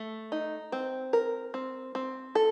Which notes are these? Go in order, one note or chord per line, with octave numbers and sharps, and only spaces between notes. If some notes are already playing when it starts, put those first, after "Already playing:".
Already playing: A3
D#4
C4
A#4
C4
C4
A4